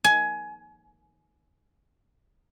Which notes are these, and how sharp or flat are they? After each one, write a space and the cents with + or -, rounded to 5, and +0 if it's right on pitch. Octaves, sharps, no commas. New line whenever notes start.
G#5 +20